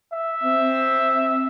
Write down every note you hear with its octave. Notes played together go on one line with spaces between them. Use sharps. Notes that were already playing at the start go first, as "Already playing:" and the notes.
E5
C4